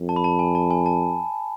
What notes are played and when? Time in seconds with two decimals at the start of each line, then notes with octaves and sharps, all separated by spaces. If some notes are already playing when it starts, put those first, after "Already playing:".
Already playing: F2
0.09 A5
0.16 B5
0.24 A5
0.39 G#5
0.55 A5
0.70 G#5
0.86 A5